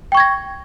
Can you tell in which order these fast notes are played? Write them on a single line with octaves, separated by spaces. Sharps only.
G5 C#6 G#6 A#6